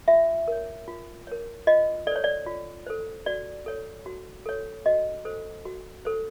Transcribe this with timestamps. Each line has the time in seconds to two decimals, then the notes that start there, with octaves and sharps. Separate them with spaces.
0.08 F4 E5
0.48 A#4 C#5
0.88 F4
1.27 A#4 C#5
1.67 F4 D#5
2.07 A4 D5
2.11 C5 C#5
2.24 D5
2.46 F4
2.87 A4 C5
3.26 F#4 D5
3.66 A4 C#5
4.06 F#4
4.46 A4 C#5
4.86 F#4 D#5
5.25 A4 C5
5.65 F#4
6.05 A4 C5